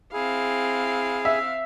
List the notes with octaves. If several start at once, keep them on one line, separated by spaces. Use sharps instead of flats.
C4 E4 G#4 F5
E5